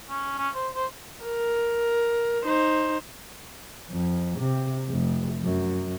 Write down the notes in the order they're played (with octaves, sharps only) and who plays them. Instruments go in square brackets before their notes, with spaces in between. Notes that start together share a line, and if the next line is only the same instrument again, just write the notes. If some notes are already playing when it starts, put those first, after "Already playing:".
[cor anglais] C#4
C#4
C5
C5
[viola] A#4
D#4 C5
[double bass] F2
C3
F1
F#2